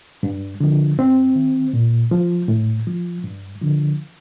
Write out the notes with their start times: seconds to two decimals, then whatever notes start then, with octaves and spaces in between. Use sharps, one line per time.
0.23 G2
0.61 D3 F3
0.98 G2 C4
1.35 D#3
1.73 A#2
2.11 F3
2.48 A2
2.87 F3
3.24 G2
3.61 D3 F3